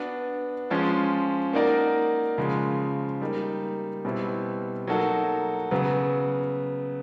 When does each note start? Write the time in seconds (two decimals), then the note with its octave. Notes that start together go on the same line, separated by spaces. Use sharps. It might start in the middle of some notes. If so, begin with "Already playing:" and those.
Already playing: B3 D4 F#4
0.70 F3 G#3 C#4 F4
1.53 A#3 D#4 F#4 A#4 D5
2.38 C#3 F3 G#3
3.21 G3 A#3 D#4
4.05 B2 G3 C4 E4
4.87 F#3 A#3 D#4 F#4 A4
5.71 C#3 F#3 B3